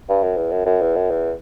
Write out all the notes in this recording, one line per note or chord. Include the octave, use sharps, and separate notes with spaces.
G2
F#2
E2
F#2
F#2
E2
F#2
E2